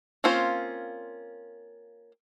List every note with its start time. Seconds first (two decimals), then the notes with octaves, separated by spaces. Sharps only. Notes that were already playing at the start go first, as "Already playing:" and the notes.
0.24 A#3 C4 C#4 F4 C5